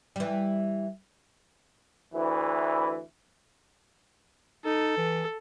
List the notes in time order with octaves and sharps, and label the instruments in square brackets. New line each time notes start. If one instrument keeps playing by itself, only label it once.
[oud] E3 G3
[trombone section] D2 E3
[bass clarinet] D#4 [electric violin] A4
[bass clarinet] E3